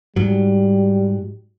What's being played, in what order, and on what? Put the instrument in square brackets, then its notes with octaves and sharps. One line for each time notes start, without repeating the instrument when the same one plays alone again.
[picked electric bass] G#2 F#3 [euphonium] G3